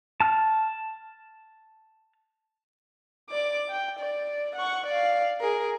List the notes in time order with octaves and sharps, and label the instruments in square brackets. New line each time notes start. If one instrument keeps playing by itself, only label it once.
[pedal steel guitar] A5 F6
[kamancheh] D5 D6
G5
D5
F#5 C#6
D5 F5
G#4 A#4